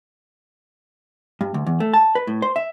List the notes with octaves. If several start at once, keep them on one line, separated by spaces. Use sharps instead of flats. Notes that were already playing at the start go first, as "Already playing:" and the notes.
G2
D2
E2
A3
A5
B4
A2
C5
E5